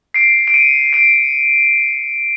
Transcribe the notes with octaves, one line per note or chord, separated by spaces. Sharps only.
C7 D7
D7
C#7 D#7
C7 D7